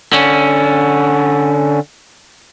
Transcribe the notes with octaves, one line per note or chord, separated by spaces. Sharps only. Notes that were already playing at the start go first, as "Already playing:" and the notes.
D3 C#4